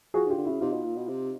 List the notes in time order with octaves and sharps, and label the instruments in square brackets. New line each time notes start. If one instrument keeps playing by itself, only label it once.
[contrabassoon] F3 [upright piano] F#4 G#4
[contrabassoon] D3
[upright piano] F4 G4
[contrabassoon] D3
[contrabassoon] C#3 [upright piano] E4 F#4
[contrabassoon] C3 [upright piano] D#4 F4
[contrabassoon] B2
A#2
B2
C3